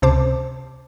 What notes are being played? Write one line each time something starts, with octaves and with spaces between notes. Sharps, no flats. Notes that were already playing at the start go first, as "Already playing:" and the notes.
C#2 C3 C5 A5 D6